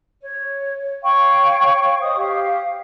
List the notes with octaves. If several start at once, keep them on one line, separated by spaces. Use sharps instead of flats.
C#5
C#5 F5 G5 C#6
C5 D#5 D#6
G4 F5